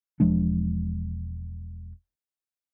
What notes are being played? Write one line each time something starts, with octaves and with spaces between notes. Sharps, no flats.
E1 F3 G#3 D4